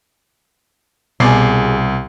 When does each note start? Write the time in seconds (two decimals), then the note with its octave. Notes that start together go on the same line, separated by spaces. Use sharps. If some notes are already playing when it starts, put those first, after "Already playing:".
1.20 C2 B2 G#4 D5 C7